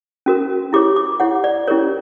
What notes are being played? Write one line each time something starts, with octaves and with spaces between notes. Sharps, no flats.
C#4 F#4 A#4
E4 G4 C#5 D6
D6
E4 G4 C#5 F#5
D5
C#4 E4 G4 A#4 C#5